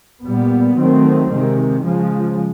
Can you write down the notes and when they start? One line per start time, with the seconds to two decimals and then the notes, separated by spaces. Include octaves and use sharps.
0.24 A#2 G3 B3
0.77 D#3 F#3 A3 C4
1.31 C3 D#3 G#3
1.85 C#3 F3 G#3